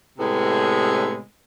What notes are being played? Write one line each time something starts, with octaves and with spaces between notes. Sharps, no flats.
A2 C3 G#3 B3